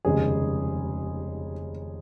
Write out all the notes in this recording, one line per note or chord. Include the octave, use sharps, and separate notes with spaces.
F1 D#2 C#3 G#3 G#4